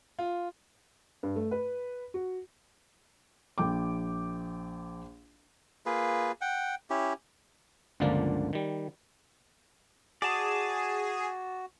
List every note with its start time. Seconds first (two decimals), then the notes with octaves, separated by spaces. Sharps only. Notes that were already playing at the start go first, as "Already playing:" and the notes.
0.19 F4
1.23 G2
1.36 A3
1.51 B4
2.14 F#4
3.58 A#1 G5 D6
5.86 A#3 F4 G#4 B4
6.41 F#5 G5
6.90 C#4 E4 G4
8.00 G1 C#2 D3 F3 A#3 D5
8.53 D#3 G3
10.22 F#4 G#4 D5 A5